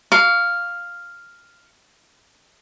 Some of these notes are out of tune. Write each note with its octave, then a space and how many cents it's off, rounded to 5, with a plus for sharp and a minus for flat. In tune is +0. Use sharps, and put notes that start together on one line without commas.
F5 +0 C#6 +35